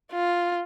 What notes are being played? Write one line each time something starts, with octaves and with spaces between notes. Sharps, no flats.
F4